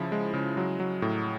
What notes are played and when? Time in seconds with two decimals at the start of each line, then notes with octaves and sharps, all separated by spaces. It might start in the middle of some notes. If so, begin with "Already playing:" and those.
Already playing: C#3 F3 E4
0.12 G#3
0.34 C#3
0.57 F#3
0.80 F#3
1.02 A2